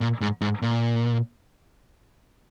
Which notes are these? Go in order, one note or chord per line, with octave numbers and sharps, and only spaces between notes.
A#2
G#2
G#2
A#2